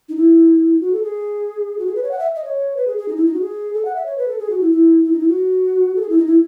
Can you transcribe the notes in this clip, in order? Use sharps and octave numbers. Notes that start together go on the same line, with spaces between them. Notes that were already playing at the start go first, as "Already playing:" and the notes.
D#4
E4
F#4
A4
G#4
F#4
G#4
B4
C#5
F#5
E5
D#5
C#5
B4
G#4
G#4
D#4
E4
D#4
F#4
G#4
A4
F#5
E5
C#5
B4
A4
G#4
F#4
E4
E4
E4
D#4
E4
F#4
A4
G#4
E4
D#4
E4